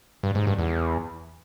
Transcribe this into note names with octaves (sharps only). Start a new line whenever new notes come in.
G2
G#2
G2
E2